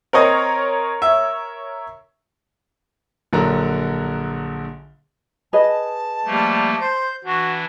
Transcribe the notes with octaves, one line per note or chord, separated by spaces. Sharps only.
C4 A#4 C#5 D#5 A#5
E5
A#1 D3 F#3 A#4 A#5
G#4 B4 D#5 A5
F3 G3 A3 A#3
C5 G6
E3 D4 F#4